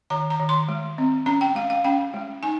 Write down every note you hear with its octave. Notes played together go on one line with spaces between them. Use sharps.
D#3 A#5
A#5
D#3
C6
G#3
C4
C#4 A#5
G5
G#3 F5
F5
C#4 G5
G#3
D#4 G#5